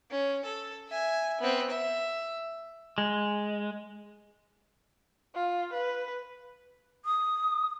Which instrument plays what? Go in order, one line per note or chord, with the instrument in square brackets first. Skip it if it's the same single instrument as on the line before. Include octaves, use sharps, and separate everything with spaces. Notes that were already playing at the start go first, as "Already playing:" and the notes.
[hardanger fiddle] C#4
A4
E5 G#5
B3 C4
E5
[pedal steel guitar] G#3
[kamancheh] F4
B4
[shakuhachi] D#6